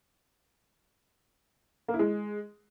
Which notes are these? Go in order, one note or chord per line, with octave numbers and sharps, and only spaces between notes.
A#3
E4
G#3